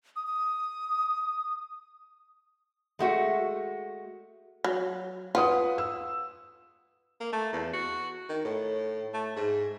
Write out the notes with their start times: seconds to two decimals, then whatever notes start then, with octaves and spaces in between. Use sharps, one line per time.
0.16 D#6
0.27 D#6
2.99 G#3 A3 F#4
4.64 F#3
5.35 F4 B4 F#5 D#6
5.78 E6
7.20 A#3
7.33 A3
7.53 E2
7.73 F#4
8.29 D#3
8.45 A2
9.14 A3
9.36 G#2